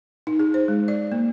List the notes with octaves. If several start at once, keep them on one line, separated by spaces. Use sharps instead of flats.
D#4
G#4
C5
G#3
D5
A#3